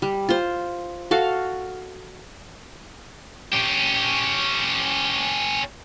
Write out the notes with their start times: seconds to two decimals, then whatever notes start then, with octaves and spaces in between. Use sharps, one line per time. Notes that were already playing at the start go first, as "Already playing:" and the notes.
0.02 G3
0.29 F4 C5
1.11 F#4 A4 F5
3.52 C#4 G4